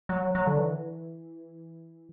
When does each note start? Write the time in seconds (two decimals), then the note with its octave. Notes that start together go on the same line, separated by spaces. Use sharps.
0.09 F#3
0.35 F#3
0.47 D3
0.59 E3